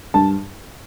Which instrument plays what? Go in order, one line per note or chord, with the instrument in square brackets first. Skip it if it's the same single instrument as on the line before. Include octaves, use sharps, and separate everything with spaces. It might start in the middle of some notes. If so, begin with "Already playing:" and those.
[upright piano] G2 A5